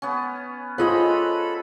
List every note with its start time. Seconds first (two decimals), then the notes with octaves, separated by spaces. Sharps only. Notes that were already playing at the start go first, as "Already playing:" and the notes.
0.02 B3 C#4
0.78 F4 G#4 A4 C5 C#5 D#5 F#5 B5